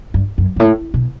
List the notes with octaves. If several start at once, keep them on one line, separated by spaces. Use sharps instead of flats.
G2
F#2
G2
A2
B2